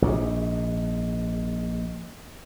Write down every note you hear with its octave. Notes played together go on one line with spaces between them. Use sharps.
A#1 G#2